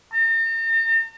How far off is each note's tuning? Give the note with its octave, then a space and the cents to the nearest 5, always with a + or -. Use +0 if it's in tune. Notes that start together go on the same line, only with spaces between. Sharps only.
A#5 -45